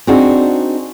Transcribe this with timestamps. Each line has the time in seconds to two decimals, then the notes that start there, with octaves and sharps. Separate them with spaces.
0.07 C4 D4 D#4 F#4 G#4